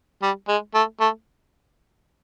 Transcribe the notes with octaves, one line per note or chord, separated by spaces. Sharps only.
G3
G#3
A3
A3